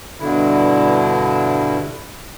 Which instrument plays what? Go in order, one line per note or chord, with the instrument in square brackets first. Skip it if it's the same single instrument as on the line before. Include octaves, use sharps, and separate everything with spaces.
[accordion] G2 B2 D3 E4